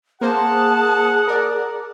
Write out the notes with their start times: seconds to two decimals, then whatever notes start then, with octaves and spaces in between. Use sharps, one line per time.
0.21 A#3 G#4 C5 F#5 A5
1.28 A#4 D5